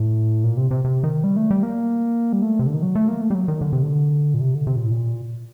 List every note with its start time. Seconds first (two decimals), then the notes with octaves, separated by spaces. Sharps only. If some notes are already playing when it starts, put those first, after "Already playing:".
Already playing: A2
0.44 A#2
0.57 C3
0.71 C3
0.85 C3
1.04 D#3
1.24 G3
1.36 A3
1.51 G3
1.63 A#3
2.33 G3
2.42 A3
2.59 C3
2.67 D3
2.74 D#3
2.83 F#3
2.95 A3
3.08 A#3
3.21 A3
3.30 G3
3.35 F#3
3.48 D#3
3.61 D3
3.73 C3
3.83 D3
4.34 A#2
4.41 C3
4.55 D3
4.67 C3
4.76 A#2
4.84 A2
4.92 A#2